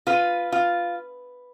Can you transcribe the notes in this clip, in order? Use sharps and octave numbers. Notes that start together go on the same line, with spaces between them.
F4 B4
F4